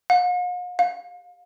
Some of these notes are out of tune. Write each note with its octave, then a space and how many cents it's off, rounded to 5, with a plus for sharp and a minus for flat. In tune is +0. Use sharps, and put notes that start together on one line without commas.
F5 +45
F5 +30